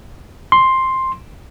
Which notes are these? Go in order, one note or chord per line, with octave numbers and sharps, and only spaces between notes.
C6